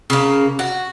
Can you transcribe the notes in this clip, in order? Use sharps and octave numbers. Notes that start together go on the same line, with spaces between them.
C#3 A#3
F#4